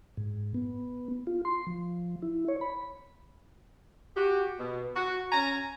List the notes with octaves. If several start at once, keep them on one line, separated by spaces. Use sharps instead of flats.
G#2
B3
F4
C6
F3
E4
C#5
B5
F#4 G4
B2
F#4
C#4 G#5 A#5